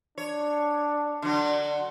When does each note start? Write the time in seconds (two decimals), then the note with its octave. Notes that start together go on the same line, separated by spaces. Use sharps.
0.18 D4 C#5
1.22 D3 F#3